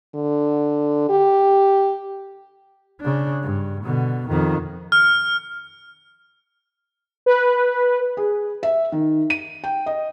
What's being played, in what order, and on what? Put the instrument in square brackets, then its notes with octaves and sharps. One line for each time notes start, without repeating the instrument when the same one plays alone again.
[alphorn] D3
G4
[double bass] C#3 D4
G2
B2 D3
F2 D#3
[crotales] F6
[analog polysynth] B4
[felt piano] G#4
E5
D#3
D#7
G5
D#5